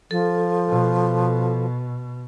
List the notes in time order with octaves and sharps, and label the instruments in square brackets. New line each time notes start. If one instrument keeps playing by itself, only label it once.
[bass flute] F3 [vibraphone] A4
[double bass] B2